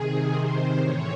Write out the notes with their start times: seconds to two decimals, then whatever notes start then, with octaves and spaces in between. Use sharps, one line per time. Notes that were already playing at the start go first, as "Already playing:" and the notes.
Already playing: C3 D#3 G#4
0.32 C3 D#3 C5
0.79 A2 E3 C#5